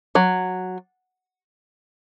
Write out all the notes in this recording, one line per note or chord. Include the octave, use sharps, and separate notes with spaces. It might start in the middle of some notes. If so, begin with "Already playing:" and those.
F#3